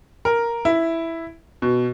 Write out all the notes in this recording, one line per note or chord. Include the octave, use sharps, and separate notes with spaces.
A#4
E4
B2